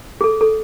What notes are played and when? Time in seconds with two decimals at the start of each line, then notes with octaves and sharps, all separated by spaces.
0.21 G#4
0.24 A4
0.41 A4